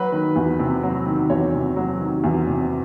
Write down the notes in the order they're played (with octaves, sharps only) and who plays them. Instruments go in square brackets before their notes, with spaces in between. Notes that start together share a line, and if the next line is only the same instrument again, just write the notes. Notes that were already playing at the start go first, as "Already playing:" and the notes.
Already playing: [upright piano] F#3 B4
D#3
E2
C3
F#3
D#3
E2 C#5
C3
F#3
D#3
E2
C3